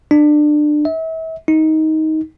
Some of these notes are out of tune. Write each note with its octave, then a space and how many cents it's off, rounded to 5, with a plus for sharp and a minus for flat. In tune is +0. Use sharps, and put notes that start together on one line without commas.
D4 +25
E5 -35
D#4 +15